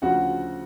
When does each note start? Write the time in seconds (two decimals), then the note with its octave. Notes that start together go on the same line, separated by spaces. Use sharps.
0.02 D2 C#3 F3 F#4 F#5